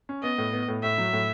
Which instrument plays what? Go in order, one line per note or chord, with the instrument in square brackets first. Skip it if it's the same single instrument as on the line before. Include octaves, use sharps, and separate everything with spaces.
[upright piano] C#4
[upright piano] B3 [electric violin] D#5
[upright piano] A2
B3
A2
[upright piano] A2 [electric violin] E5
[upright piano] F#3
A2